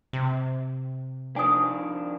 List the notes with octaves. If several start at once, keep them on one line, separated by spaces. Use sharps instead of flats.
C3
D#3 F3 D4 G#5 D#6